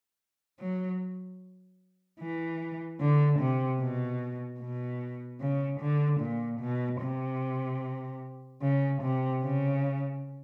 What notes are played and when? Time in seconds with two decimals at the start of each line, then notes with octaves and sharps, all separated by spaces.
0.60 F#3
2.20 E3
3.01 D3
3.40 C3
3.81 B2
4.60 B2
5.41 C#3
5.80 D3
6.21 A#2
6.61 B2
7.01 C3
8.62 C#3
9.02 C3
9.43 C#3